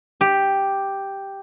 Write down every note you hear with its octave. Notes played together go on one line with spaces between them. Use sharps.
G4